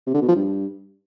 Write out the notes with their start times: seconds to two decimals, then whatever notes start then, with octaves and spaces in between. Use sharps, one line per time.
0.07 C3
0.14 D3
0.21 B2
0.28 F3
0.36 G2